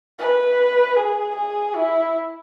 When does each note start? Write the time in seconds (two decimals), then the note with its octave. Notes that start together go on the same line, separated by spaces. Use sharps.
0.19 B4
0.97 G#4
1.35 G#4
1.76 E4